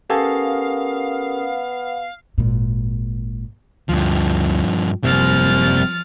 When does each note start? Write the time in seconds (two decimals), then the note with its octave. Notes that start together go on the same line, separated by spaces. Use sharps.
0.10 B3 C#4 G4 A4 A#4 F5 G#5 D#6
2.38 G#1 A#2
3.89 D2 G2 F3
5.04 F#1 C3 F3 G3 A#3 C4 F6 A6